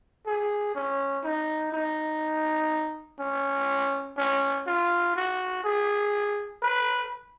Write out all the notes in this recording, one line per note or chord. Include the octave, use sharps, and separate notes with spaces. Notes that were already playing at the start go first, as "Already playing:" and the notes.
G#4
C#4
D#4
D#4
C#4
C#4
F4
F#4
G#4
B4